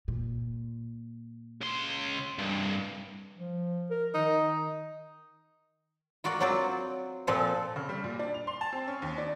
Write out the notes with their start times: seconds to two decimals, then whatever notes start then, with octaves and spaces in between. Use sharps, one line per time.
0.08 A#2
1.61 C#3 C6
2.38 C2 G2
3.38 F3
3.90 A#4
4.14 D#3 D#4
6.24 F4 F#4 A#4 D5 F#5
6.40 F#3 C4 F4 C5 D5
7.27 A#2 F3 C4 A4 F5
7.76 C#3
7.89 G3
8.04 A#2
8.19 D4
8.34 F7
8.47 C6
8.61 A5
8.73 C4
8.87 C#4
9.02 D#2
9.18 D4